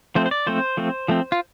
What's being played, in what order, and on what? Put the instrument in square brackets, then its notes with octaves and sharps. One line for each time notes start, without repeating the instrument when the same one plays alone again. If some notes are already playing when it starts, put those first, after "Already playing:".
[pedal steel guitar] F3 A3 C4 C5
C5
D5
F3 A3 C4 C5
F3 A3 C4
F3 A3 C4
F4